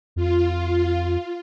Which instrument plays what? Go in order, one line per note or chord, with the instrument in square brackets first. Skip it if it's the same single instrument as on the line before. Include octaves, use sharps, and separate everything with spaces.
[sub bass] F2 [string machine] F4